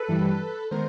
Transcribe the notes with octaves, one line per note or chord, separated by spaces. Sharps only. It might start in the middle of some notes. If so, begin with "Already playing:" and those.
Already playing: A4 B4
G2 E3 G3
D#3 G#3 B3 A#4 C5